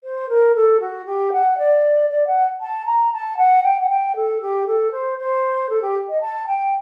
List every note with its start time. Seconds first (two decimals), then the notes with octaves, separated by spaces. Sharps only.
0.03 C5
0.28 A#4
0.55 A4
0.80 F#4
1.05 G4
1.32 F#5
1.57 D5
2.09 D5
2.26 F#5
2.60 A5
2.85 A#5
3.12 A5
3.37 F#5
3.63 G5
3.80 F#5
3.89 G5
4.15 A4
4.41 G4
4.66 A4
4.91 C5
5.18 C5
5.69 A4
5.81 G4
6.08 D#5
6.20 A5
6.47 G5